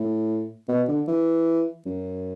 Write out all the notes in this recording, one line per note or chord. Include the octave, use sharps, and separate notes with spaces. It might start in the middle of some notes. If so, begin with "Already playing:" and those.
Already playing: A2
B2
D3
E3
F#2